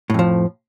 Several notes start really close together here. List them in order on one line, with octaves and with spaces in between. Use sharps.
A2 F2 F3